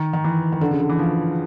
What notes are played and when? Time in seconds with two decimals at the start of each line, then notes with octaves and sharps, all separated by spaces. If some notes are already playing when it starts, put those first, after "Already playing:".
Already playing: D#3
0.13 D#3
0.24 E3
0.52 D#3
0.61 D3
0.71 C#3
0.80 D3
0.89 E3
0.99 F3